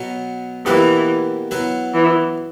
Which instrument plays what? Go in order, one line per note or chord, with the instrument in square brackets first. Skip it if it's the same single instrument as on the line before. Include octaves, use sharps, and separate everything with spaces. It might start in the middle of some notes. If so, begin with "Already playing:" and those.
Already playing: [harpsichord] B2 F#3 B3
[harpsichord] B2 A#3 E4 G4 B4 [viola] E3
[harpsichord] F#3 B3 E4 B4
[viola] E3